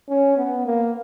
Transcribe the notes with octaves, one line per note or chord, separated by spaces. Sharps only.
C#4
B3
A#3